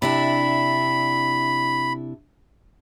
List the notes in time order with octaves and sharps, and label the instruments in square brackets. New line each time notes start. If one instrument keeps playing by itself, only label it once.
[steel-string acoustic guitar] C3 D4 E4 [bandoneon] B5